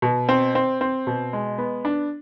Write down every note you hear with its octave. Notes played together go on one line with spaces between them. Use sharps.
B2
C4
C4
C4
B2
G#3
B3
D4